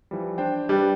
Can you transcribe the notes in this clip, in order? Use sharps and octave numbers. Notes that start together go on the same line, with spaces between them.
E3 F3 G3
D4 C5 G5
G3 D4 B4